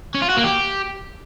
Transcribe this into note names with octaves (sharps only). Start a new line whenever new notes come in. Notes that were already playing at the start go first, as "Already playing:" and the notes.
C#4
F4
F#4
A#3
G4